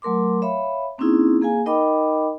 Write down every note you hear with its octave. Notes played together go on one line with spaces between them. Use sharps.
F#3 A3 A#4 C6 D6
C#5 E5 F5 B5
A#3 C4 C#4 D#4 E4 G#4
A#3 G#4 F5 G#5
D#4 A#4 D#5 G5 B5 D6